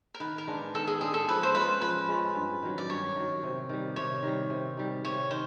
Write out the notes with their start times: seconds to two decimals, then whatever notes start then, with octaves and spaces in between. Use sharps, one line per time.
0.14 A#4
0.20 D#3 B4
0.38 A#4
0.47 G#3 B3 D4
0.74 D#3 A4
0.87 G#4
1.01 G#3 B3 D4 G#4
1.14 A4
1.28 F3 B4
1.43 C5
1.55 G#3 C#4 F4 B4
1.81 F3 B4
2.08 G#3 C#4 F4
2.36 G2
2.63 D#3 F#3
2.78 D5
2.89 G2 C#5
3.16 D#3 F#3
3.43 C3
3.69 D#3 G3
3.96 C3 C#5
4.23 D#3 G3
4.50 C3
4.77 D#3 G3
5.04 C3 C#5
5.31 D#3 C5